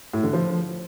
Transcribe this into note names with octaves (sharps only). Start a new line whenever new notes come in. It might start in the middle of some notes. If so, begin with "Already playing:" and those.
A2
D3
F3